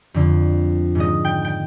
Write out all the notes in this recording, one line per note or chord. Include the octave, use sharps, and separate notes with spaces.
F2 D3
G#2 D#3 D#5
G5
G5